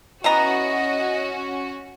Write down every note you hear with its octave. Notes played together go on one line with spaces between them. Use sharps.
E3 B3 C#4 F#4 D#5 A#5